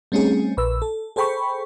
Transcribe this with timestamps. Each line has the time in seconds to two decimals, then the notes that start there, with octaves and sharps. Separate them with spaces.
0.12 G3 A3 C4 C#4 D#4 G#4
0.57 A#1 B4 E6
0.82 A4
1.16 G#4 A4 C5 G5 B5 C#6